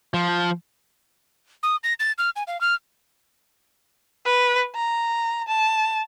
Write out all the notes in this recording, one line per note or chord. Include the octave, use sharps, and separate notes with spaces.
F3
D#6
A#6
A6
F6
G#5
F5
F6
B4
A#5
A5